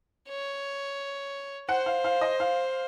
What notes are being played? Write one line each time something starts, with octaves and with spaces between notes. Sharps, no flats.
C#5
C5 F#5
F5
F5
D#5
F5